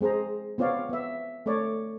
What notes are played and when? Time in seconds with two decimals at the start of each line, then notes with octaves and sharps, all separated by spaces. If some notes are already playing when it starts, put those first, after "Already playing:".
0.01 G#3 C4 G#4 C5 A#5
0.58 B3 C4 F4 C#5 D5 F5
0.89 B3 E5
1.46 A3 C4 C#5 D5